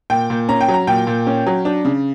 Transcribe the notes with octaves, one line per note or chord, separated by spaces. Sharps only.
A#2 G5
A#2
C#4 A#5
G5
F#3
A#5
A#2 G5
A#2
C#4
F#3
D4
C#3